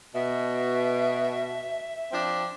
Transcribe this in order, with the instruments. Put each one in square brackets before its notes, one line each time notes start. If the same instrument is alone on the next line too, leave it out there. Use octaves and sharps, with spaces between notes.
[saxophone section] B2 [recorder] E5
[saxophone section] F3 C4 D4